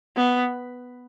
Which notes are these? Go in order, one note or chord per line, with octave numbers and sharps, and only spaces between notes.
B3